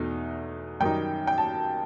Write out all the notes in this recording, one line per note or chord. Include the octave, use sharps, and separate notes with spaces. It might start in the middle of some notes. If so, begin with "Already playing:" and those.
Already playing: E2 B2 A3 D#4
F#2 D#3 G3 D#4 G5
G5
A5